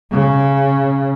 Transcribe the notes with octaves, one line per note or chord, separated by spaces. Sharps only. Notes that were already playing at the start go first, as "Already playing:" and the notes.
C#3